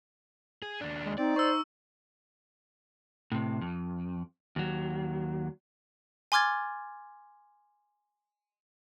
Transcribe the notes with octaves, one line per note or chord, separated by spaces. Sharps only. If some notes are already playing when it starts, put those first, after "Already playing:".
G#4
D#2 D4
G#3
C4 D#4 D5
C5 C#6 E6
A2 C3
F2
D#2 F#3
G#5 C6 D6 F6 G#6 A6